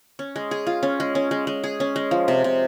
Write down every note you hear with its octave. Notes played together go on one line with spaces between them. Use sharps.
C#4
G#3
G#4
F4
C#4
G#3
C#4
G#3
G#3
G#4
C#4
G#3
F3
C3
C3